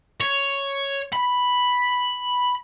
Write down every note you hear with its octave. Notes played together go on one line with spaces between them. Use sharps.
C#5
B5